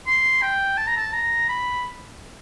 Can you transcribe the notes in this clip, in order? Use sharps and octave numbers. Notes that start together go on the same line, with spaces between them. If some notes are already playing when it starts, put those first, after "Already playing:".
C6
G5
A5
A#5
A5
A#5
B5